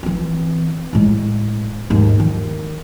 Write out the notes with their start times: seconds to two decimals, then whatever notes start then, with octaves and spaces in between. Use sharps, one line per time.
0.03 E3 C4
0.93 A2 G#3
1.90 D#2 G#2
2.20 D#3